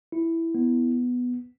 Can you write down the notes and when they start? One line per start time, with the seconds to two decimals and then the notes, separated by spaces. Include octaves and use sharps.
0.12 E4
0.55 B3